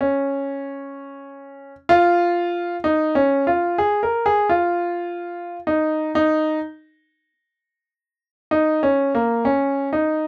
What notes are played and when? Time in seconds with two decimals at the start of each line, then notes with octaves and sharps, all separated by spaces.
0.01 C#4
1.89 F4
2.84 D#4
3.15 C#4
3.47 F4
3.78 G#4
4.03 A#4
4.26 G#4
4.49 F4
5.67 D#4
6.15 D#4
8.51 D#4
8.83 C#4
9.15 A#3
9.45 C#4
9.93 D#4